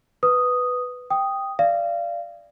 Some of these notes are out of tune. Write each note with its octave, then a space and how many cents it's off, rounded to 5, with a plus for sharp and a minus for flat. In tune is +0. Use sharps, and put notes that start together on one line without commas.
B4 +5 D#6 +0
G5 +0 D#6 +0
D5 +0 F5 -25